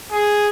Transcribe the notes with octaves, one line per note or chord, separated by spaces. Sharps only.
G#4